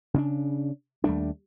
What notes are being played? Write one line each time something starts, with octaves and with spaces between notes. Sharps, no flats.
C#3 C4 D4
D#2 G3 A3 D4